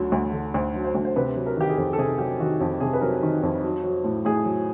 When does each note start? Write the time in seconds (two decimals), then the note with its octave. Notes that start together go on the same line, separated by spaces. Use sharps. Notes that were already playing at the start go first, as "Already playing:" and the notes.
Already playing: D2 D3 F#3
0.12 D2
0.33 D3
0.54 D2 C5
0.75 F#3
0.84 C5
0.95 D2
1.05 C5
1.16 C3 B4
1.36 F#3
1.46 A#4
1.57 D#3 G4
1.69 G#4
1.77 F2 A4
1.93 A4
1.99 C3 G#4
2.19 F#3 G4
2.40 D#3 F#4
2.60 F2 G4
2.80 C3 G#4
2.93 B4
3.01 F#3 A#4
3.23 D#3
3.43 F2
3.64 F#3
3.84 F#3
4.04 A2
4.25 A2 G#4
4.46 F#3